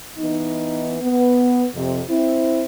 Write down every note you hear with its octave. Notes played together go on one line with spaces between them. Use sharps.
E3 B3 D#4
B3
F2 C3
C4 E4